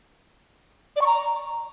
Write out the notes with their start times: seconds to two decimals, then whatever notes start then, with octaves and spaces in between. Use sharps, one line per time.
0.96 D5
1.01 C#6
1.06 A#5